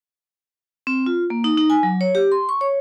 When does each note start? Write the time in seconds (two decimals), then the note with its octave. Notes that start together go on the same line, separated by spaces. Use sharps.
0.87 C4
1.06 F4
1.30 A#3
1.44 D#4
1.58 D#4
1.70 G#5
1.83 F#3
2.01 C#5
2.15 G4
2.32 C6
2.49 C#6
2.61 C#5